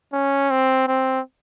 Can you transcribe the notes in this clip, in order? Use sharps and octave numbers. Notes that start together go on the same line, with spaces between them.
C#4
C4
C4